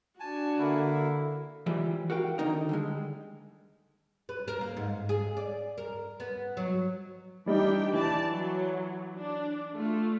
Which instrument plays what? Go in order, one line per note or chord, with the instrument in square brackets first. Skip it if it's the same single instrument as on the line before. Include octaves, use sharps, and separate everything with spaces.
[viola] D4 F#4 [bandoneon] G#5 A5
[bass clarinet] D3 [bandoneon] A#3 E4
[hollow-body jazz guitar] E3 F3 G3 G#3
F#4 A#4 F5 G5
D3 D#3 D#4 A#4
D3 G3 G#3
[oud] B4
A#4
A#3
G#2
G#4
D5
A#4
B3
F#3
[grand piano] E3 G3 D#4 [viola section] D4 G4 G5
[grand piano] E3 [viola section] D5 A5
[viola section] F#3
D4
A3 F4